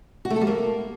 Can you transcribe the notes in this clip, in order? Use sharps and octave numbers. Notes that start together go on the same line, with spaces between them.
F#4
A3
A4
G3
A#3